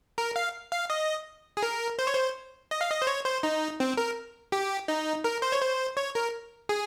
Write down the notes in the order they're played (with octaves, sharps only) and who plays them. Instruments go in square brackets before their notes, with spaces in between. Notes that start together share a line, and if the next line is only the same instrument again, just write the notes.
[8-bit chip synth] A#4
F5
F5
D#5
G#4
A#4
C5
C#5
C5
D#5
F5
D#5
C5
C#5
C5
D#4
C4
A#4
G4
D#4
A#4
C5
C#5
C5
C#5
A#4
G#4